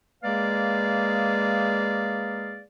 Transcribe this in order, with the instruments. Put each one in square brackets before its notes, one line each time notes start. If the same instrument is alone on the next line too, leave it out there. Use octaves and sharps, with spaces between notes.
[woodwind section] G#3 A#3 G#4 B4 D5 F5